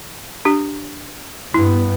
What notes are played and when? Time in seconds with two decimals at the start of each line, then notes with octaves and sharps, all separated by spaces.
0.45 D4 G4
1.54 G2 B3 E4